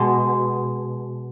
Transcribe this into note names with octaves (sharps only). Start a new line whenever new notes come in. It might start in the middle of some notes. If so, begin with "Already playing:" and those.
Already playing: B2 G#3